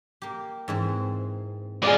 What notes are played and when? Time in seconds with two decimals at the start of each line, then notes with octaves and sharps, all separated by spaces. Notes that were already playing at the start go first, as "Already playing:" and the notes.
0.22 A#3 G4
0.68 G#2 E3 C4
1.82 G#3 F4 G#4 D5